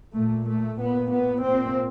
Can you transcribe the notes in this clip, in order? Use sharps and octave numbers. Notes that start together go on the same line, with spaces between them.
A#2 A3
A3
A#2 B3
B3
A#2 C4